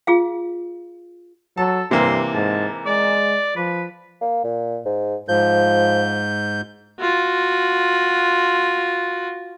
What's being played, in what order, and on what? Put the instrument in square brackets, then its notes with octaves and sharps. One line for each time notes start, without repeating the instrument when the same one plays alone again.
[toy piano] F4 G#4 F5
[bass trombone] F#3 [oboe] A4 [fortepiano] A5
[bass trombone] G2 [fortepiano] C3 E3 A#3 [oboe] C6
[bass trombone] G#2 [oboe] A5
[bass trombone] G#3 [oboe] D5
[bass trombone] F3 [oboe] B4
[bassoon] A#3
A#2
G#2
[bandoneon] G#2 G6 [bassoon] F3
[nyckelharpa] F4 F#4